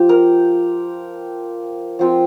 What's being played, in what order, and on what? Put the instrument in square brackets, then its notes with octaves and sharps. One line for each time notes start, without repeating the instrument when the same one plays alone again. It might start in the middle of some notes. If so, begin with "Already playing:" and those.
Already playing: [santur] F3 G4
A#4
F3 C4 F4